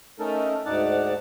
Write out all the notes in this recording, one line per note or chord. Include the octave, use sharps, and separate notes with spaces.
A3 C#4 D#4 A4 A#4
D2 G#2 D#4 D5 F#5 A5